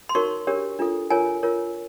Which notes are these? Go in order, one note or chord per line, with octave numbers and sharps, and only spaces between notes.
C6
D#4 F#4 A#4 C#5 C#6
D4 G4 A#4 C#5
D4 F4 A4
F4 A#4 C#5 G#5
F4 A#4 C#5